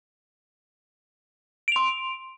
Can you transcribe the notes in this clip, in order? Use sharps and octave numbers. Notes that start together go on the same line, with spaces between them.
C6 D7 F7